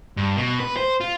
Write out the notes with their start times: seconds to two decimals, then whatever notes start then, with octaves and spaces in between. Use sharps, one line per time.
0.17 G2
0.37 B2
0.60 B4
0.77 C5
1.01 F4